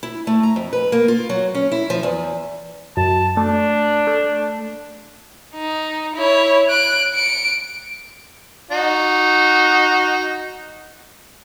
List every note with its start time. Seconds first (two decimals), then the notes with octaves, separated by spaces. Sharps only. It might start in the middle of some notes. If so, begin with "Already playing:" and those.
0.03 E4
0.27 A3
0.43 A#5
0.56 F2
0.73 B4
0.92 A#3
1.08 F4
1.29 F#3
1.55 C#4
1.72 E4
1.90 F3
2.03 E2
2.97 F#2 A5
3.37 A3 D4
4.07 A3
5.54 D#4
6.15 E4 C#5
6.70 F#6 D7
7.14 C#7 D7
8.71 D#4 F#4